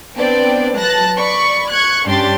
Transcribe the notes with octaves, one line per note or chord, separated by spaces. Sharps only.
B3 C4 D4 B4 D5 G5
F#3 B4 A5 F#6 A6 A#6
D5 B5 C#6
C#6 F#6 G#6
G2 C#4 D4 G4 C6 A6